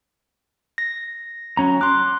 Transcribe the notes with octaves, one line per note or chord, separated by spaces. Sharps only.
A#6
F#3 C#4 A#5
C6 D6 F#6